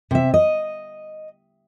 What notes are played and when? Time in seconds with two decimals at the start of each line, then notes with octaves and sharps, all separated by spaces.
0.11 C3 E5
0.34 D#5